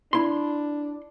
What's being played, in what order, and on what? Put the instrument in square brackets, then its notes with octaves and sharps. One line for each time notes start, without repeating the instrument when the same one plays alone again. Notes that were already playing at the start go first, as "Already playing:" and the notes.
[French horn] D4 [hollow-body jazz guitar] E4 C6